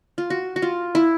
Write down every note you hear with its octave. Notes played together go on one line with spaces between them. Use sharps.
F4
F#4
F#4
F4
E4